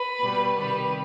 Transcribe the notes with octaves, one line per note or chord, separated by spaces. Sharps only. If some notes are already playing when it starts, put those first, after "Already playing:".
Already playing: B4
B2 G3
C3 D#3 G3 B4